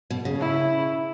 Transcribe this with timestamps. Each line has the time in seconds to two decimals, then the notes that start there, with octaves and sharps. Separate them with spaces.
0.10 B2
0.25 C#3
0.40 E4